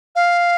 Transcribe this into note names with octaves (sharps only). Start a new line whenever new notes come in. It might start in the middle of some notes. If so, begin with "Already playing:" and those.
F5